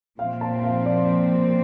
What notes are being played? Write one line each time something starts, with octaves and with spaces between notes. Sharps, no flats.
A#2 F3 C4 F5
A5
F5
D5